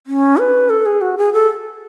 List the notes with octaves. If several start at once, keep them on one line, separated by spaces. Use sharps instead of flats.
C#4
B4
A4
G#4
F#4
G#4
A4